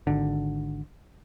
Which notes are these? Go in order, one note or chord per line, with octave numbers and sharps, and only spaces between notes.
G#1 D3